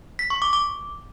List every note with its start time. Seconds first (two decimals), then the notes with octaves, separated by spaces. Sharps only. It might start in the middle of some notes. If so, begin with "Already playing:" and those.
0.19 B6
0.30 C#6
0.42 D6
0.53 D6